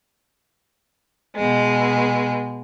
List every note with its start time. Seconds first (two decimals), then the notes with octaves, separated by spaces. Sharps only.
1.37 B2 G#3